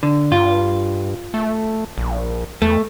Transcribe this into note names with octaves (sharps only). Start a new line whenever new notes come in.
D3
G2 F4
A3
A#1
E2 A3